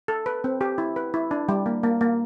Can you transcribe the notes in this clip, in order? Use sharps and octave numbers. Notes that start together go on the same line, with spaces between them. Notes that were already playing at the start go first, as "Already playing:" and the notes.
A4
B4
C4
G4
E4
B4
E4
D4
G3
A#3
A#3
A#3